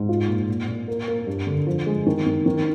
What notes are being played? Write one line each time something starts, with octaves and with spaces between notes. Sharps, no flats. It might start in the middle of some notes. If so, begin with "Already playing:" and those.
Already playing: G#2
F4
A#2
A#2
A#2
A#3
A#3
G2
D3
F3
G#3
D#3
D#3
D#3